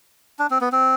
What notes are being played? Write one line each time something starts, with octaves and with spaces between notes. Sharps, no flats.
D4
C4
B3
C4